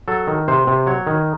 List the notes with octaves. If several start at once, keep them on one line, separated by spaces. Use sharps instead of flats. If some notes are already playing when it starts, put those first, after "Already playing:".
F#3 A4
D#3
C3 C5
C3
F#3 C#5
D#3